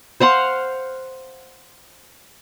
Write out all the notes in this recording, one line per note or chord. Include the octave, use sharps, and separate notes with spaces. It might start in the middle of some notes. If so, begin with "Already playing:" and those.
C5 F5 F#5 C6